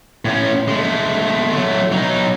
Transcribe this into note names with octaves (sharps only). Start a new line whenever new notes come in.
A2 C#4
G#3 A3
F#3 A3
F#3 D#4